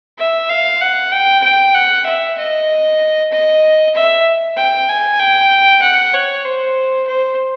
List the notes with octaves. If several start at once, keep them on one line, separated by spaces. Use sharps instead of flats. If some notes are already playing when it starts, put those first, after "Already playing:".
E5
F5
F#5
G5
G5
F#5
E5
D#5
D#5
E5
G5
G#5
G5
F#5
C#5
C5
C5